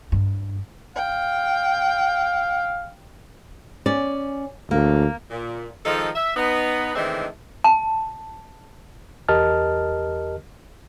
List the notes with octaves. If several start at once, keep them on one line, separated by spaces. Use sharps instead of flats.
G2
F5 G5
C#4 D5
D2 A#3
A#2
D#3 F3 G#3 D#4 A4
E5
B3 D#4
D#3 E3 G#3 A3 C4 D4
A5
E2 G4 A#4 D#5 A5 F6